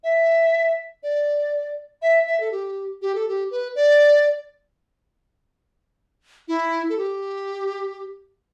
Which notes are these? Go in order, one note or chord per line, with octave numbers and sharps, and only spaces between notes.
E5
D5
E5
E5
A4
G4
G4
A4
G4
B4
D5
E4
A4
G4